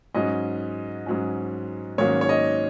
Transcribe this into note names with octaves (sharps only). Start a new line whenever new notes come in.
G#2 F#3 C#4 D#5
G#2 F#3 C#4
G#2 D#3 F#3 A#3 C#4 C#5
C#5
D#5